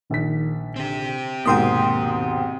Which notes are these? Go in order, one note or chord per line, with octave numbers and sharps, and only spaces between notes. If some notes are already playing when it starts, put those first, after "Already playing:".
A#1 D#3 B6
D3 C4 G4
D#2 G#2 B2 A#3 G5 C6 D#6